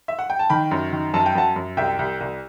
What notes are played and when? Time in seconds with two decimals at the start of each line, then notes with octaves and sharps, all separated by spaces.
0.08 E5
0.19 F#5
0.30 G5
0.39 A5
0.50 D#3 G5 B5
0.71 F#2
0.92 D#3
1.14 F#2 A5
1.26 G5
1.35 F#2 F#5 A5
1.56 F#2
1.77 C2 E5 G5
1.99 C2
2.21 C2